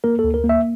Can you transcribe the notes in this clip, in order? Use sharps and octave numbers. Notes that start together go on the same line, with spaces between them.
A#3 A#4
A4
D2
A#4
A#3
E5